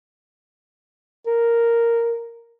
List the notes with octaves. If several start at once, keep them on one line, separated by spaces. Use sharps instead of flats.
A#4